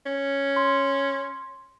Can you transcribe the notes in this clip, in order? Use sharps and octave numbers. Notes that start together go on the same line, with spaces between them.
C#4
C6